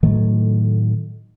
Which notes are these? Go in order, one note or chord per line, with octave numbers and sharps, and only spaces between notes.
A2 D#3 F#3 A3